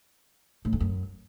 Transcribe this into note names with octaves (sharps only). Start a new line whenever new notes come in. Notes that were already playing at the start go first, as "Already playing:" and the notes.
A2
F2
F#2